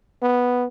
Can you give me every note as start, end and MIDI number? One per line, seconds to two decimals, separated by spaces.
0.22 0.67 59